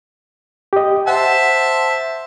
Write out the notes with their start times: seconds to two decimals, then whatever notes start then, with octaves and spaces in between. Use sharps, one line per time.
0.73 G4 D#5
1.07 C5 E5 F#5 A5